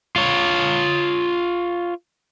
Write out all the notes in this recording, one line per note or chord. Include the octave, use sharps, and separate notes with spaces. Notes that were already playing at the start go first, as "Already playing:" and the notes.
F4 C#5